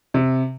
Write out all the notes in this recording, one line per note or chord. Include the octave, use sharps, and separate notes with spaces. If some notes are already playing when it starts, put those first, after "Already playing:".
C3